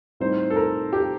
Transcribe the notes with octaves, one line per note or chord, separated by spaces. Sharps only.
A2 G3 C4 D#4 C5
A4
A#4
G4